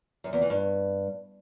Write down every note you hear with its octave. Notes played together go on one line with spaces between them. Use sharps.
F#2
E2
E3
G2